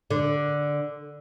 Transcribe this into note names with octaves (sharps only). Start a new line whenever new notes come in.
D3